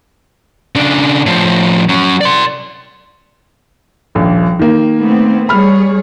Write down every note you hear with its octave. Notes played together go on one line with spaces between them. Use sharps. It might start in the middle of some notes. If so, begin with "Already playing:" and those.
C#3 D4
A2 F3
F#3 C#4
D5 C6
D#1 A#1
D#3 A#3
A3 B3 C4
G3 G#4 C#5 B5 F6